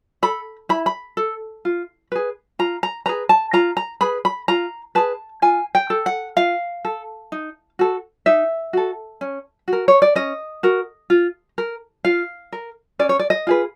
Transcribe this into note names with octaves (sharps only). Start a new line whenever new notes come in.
A4 B5
E4 B5
B5
A4
F4
G#4 B4
F4 A#5
A#5
G#4 B4 A#5
A5
F4 A#5
A#5
G#4 B4 B5
B5
F4 A#5
G#4 B4 A5
F4 G#5
G5
A4
F#5
F4 F5
A4
D#4
F#4 A4
D#4 E5
F#4 A4
C#4
F#4
A#4
C#5
D5
C#4 D#5
F#4 A#4
F4
A#4
F4 F5
A#4
C#4 D5
C#5
D5
D#5
F4 G#4 B4